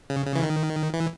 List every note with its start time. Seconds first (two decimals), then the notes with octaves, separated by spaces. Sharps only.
0.10 C#3
0.26 C#3
0.35 E3
0.43 D#3
0.93 E3